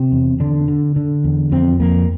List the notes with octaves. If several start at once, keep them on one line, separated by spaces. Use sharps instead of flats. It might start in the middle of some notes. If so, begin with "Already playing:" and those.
Already playing: C3 C4
E2
D3 D4
D3
D3
E2
F2 C4
F2 A#3